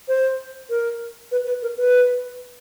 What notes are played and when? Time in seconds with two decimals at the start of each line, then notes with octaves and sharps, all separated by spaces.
0.08 C5
0.70 A#4
1.32 B4
1.46 B4
1.62 A#4
1.77 B4